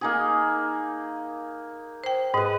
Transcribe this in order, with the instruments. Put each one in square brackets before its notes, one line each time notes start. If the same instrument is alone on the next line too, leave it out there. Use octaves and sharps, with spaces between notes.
[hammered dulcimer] A#3 D#4 G#4
[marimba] C5 G5
[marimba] G#2 [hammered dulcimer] B4 D#5